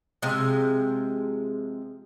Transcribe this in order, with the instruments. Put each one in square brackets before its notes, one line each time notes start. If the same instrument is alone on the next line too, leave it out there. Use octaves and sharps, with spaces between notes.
[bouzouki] C3 F3 G#3